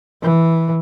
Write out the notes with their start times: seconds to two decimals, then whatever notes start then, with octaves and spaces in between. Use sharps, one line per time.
0.22 E3